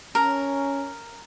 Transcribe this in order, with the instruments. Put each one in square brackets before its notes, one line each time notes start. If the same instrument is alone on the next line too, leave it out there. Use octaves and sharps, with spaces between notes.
[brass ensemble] C#4 [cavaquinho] A#4